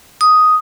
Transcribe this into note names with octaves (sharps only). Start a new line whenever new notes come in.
D#6